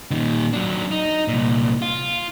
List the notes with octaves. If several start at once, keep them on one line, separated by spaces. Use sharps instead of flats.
A#2 D#3
F#3 D4
D#4
C2 A#2
F4